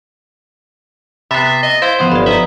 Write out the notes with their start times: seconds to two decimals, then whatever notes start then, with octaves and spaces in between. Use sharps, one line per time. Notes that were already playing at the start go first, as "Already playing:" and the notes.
1.31 C3 B3 E5 B5 F#6 A6 C7
1.63 D#5
1.82 E4 C5 D#5 F5
1.99 F3 B3 F#5 C6 D#6
2.12 G1 D5 B5
2.26 D#4 B4 D#5 E5